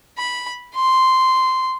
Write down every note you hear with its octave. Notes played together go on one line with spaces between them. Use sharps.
B5
C6